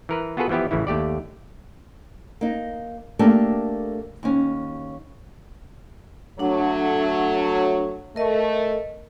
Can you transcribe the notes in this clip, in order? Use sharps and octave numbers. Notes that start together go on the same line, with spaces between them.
E3 A#4 B4
B3 F4 F#4 G#4 A4 B4
E3 F3 B3 E4 G4
A1 C#3 E3 E4
D#2 A3 G4 D5
A#3 D#4
A3 A#3 D4 G4 A4 A#4
D#2 C#4
F#3 A3 D4 F#5
A3 A#4 D#5